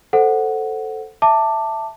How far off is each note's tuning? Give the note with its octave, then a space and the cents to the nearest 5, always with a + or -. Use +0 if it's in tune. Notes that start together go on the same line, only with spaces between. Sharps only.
A4 +5 C5 +0 F#5 +0
E5 +0 A5 +15 D6 +5